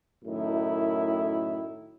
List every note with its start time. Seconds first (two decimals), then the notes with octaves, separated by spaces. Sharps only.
0.25 F#2 A2 D#3 E4